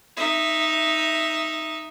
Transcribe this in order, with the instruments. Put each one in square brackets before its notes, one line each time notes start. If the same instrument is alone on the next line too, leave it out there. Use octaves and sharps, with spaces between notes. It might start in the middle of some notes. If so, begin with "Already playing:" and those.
[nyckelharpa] D#4 E5